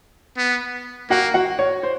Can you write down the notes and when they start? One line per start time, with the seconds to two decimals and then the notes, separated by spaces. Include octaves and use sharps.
0.37 B3
1.10 A#3 F#4 F#5
1.34 F#4 F#5
1.59 C#5
1.83 C5